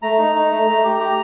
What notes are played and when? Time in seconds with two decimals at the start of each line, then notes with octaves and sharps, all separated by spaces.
0.02 A3 A#5
0.18 D#4
0.35 D#4
0.51 A3
0.68 A3
0.84 G4
1.00 G4